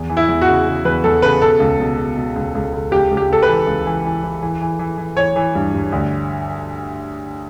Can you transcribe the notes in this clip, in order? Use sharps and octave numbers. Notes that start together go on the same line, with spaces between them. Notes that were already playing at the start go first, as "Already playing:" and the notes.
Already playing: E2
E3
E4
E2
F#4
C#3
C#3
E2 B4
E2 A4
C#3 B4
B2 A4
C#2
B2
B2
B2
C#2
C#2
C#2
C#2 G4
C#2
G4
C#2 A4
B4
E3
C#2
E3
E3
E3
E3
E3
E3
E3
E3 C#5
E3
G2
G2
D2